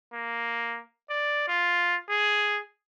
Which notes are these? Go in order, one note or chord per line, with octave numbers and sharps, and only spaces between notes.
A#3
D5
F4
G#4